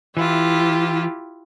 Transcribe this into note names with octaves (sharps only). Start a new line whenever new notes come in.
E3 E4 F4 G4